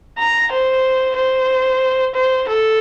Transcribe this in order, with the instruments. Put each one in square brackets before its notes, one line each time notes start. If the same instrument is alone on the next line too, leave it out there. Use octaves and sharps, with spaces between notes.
[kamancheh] A#5
C5
C5
C5
A4